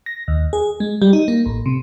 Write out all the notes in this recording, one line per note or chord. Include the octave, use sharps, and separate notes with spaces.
A#6
D#2
G#4
G#3
G3
D#4
A#3
A1
C3